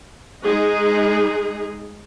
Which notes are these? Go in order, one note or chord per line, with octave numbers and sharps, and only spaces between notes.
G#3 D#4 G#4